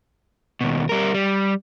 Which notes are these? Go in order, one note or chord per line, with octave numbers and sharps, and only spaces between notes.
D#2 B2
G3 A#4
G3